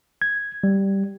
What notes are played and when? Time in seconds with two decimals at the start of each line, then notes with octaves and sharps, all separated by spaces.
0.22 G#6
0.64 G3